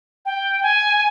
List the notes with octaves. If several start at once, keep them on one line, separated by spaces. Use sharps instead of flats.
G5
G#5